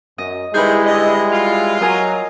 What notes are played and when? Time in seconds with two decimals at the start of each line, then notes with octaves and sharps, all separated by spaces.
0.18 F#2 D#5
0.54 D#3 G3 G#3 E4 G#4 B4 G6
0.87 D3 D#5
1.33 F4
1.81 F#3 A#4 D#5 G#5